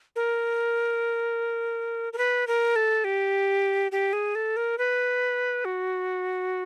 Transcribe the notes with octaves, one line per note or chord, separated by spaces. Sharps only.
A#4
A#4
B4
A#4
A4
G4
G4
G#4
A4
A#4
B4
F#4